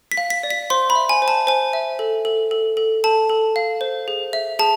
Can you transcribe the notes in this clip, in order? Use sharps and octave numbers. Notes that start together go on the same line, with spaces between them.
B6
F5
B6
D5
B6
C5 C6
B5
E5
G#5
C5
A5
C5 G#5
E5
A4
A4
A4
A4
A4 A5
A4
F5
C5
G#4
E5
G#4 A5